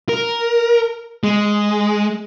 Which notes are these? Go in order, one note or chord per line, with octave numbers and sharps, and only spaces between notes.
A#4
G#3